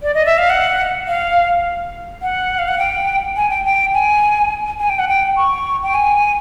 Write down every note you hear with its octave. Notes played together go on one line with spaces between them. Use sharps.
D5
D#5
E5
F5
F#5
F5
F#5
F5
F#5
G5
G#5
G5
G5
G#5
G#5
G5
F#5
G5
C#6
G5
G#5